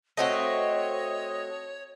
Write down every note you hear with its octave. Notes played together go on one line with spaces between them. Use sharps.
A3 C4 F#4 C#5 D#5